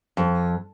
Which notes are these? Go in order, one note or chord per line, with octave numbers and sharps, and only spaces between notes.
F2